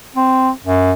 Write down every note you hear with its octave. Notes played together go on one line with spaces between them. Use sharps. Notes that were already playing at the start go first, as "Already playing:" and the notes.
C4
F#2